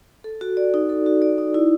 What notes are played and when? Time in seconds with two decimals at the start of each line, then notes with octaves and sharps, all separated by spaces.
0.24 A4
0.41 F#4
0.57 D5
0.74 D#4
0.89 A4
1.06 F#4
1.22 D5
1.38 D#4
1.54 E4